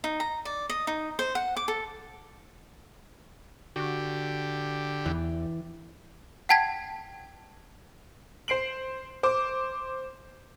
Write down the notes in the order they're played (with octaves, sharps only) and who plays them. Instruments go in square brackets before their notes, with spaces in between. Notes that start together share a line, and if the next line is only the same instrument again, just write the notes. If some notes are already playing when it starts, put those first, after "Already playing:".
[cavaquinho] D#4
A#5
D5
D#5
D#4
C5
F#5
D6
A4
[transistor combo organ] D3 G4 [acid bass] F#4
[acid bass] E2 [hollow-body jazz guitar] E3
[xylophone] F#5 G5 A5 G#6 B6
[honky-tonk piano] C5 C7 D7 F#7
C5 D6